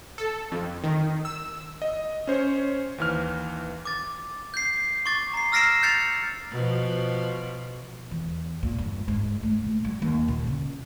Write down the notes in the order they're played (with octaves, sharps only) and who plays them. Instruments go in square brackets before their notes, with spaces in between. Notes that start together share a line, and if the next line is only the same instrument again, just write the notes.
[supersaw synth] A4
F2
D#3
E6
[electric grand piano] D#5
C#4 C5 C#5
D#2 E3 F6
[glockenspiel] D6 A6
G6 C7
C#6 D6 A6
A#5 C7
E6 F6 A#6 C7 D7 E7
G6 A6 C#7 F7
[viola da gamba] B2 F3
[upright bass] E2
A#2
G2
G#2
A3
A#2
G3
D#2
A#2
C#3